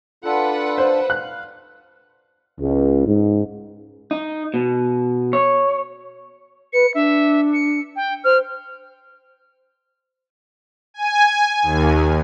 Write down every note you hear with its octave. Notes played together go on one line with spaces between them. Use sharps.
D4 F4 A4 B4 F#5
C5
F5 F#6
C#2
G#2
D#4
B2
C#5
B4 C#7
D4 E5
C#7
G5
C5 F6
G#5
D#2